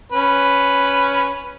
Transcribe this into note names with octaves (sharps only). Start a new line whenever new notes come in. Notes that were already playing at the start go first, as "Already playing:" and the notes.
C#4 B4